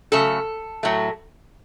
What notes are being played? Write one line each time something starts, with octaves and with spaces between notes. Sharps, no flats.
C#3 F#3 A3 A4
A2 F#3 A3